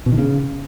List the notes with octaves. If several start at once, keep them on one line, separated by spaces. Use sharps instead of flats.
B2
D#3
C#3